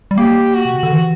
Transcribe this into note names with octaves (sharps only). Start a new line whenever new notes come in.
G3
A#3 G4
F#4
B2
C#3
D3
E3